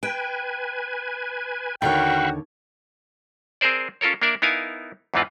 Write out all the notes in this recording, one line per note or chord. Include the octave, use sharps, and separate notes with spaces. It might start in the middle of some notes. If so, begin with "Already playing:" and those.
B4 G5 G#5
D#2 D3 F#4 C#5 F5 G5 B5 C#6
C4 G#4 A#4 C5 D5
C#4 F4 A4 A#4 C#5
A#3 D4 A#4 D5 E5
B3 D#4 E4 A#4 F5 G#5
E2 G#2 E3 C4 F4 B4